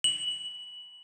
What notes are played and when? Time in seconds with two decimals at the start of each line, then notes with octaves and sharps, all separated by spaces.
0.04 F#7